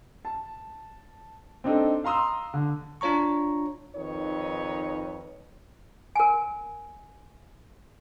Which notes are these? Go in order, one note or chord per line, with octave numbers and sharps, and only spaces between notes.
A5
C4 D4 D#4 A4
F5 A#5 C6 D#6 E6
D3
D4 F4 C#5 A#5 C#6
F2 D#3 D#4 B4 C#5
A#4 G#5